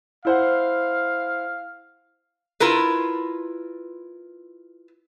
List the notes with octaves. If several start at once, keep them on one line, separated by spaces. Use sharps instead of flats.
E4 C5 F5 F#5
E4 F4 A#4 B4